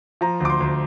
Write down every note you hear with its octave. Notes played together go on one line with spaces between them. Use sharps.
F3 A#5
D2 D6
C6
D2